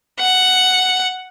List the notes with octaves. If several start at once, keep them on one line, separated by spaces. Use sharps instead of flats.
F#5